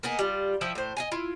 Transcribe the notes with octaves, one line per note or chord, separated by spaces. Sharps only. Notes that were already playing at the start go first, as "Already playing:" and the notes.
A#3 B3 D#4 G#4
G3 F4
F3 E4 G5
A2 C5
D#5 F5 G#5
E4 F4